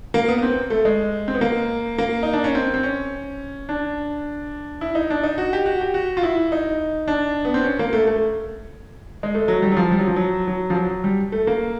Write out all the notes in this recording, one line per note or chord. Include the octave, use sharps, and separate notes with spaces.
A#3
B3
B3
C4
A3
G#3
C4
B3
A#3
A#3
D#4
D4
C#4
C4
C4
C#4
D4
E4
D#4
D4
D#4
F#4
G4
F#4
G4
F#4
F4
E4
D#4
D4
B3
C4
C#4
A#3
A3
A3
G#3
A3
F#3
G3
F#3
F3
G3
F#3
F3
F#3
F#3
F3
F#3
G3
A3
A#3